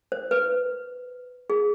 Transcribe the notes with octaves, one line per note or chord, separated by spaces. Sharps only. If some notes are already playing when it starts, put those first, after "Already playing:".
C5
B4
G#4